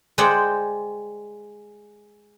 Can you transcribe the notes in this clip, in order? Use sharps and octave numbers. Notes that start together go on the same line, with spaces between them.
G#3 C5 D5 F#5 G5